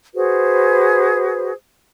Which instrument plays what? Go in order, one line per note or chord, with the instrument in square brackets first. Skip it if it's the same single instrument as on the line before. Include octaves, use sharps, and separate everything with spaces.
[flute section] F#4 G#4 B4 C5